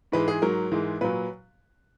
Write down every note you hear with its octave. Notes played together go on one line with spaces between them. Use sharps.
G#2 E3 G#3 B4
G#4
G#2 F#3 A#4
G#2 E3 G#3
A#2 F#3 B4